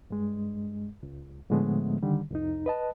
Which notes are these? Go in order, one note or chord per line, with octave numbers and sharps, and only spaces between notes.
G2 G#3
C#2
A2 D3 F3 G#3 A3 B3
D3 D#3 G3
C2 F2 D#4
B4 D#5 A5